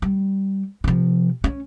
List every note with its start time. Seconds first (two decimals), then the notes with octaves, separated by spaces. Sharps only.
0.02 G3
0.84 C3 F3
1.44 C#4